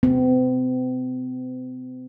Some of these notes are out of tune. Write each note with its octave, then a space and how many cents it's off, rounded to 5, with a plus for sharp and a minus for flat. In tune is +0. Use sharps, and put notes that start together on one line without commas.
C4 -45